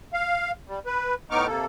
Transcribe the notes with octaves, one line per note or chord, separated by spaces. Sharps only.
F5
G3
B4
A2 B3 D#4 C#6 D6 F6
C3 A#3 A4